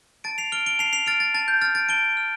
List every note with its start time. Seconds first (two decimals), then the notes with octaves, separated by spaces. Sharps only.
0.24 A5 A6 D7
0.38 C7 F7
0.52 F6 D7 G7
0.66 D7 G7
0.79 A5 C7 F7
0.93 C7 F7
1.06 F6 A6 D7
1.20 A6
1.34 A5 A6
1.48 G6
1.62 F6 A6
1.75 A6 D7
1.89 A5 D7 G7
2.17 F6